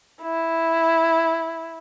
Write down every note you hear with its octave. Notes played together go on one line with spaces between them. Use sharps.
E4